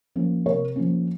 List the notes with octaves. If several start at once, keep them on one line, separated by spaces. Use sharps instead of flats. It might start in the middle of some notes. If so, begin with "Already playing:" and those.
F3 A#3 C#4
C3 A#4 C#5
F3 A#3 C#4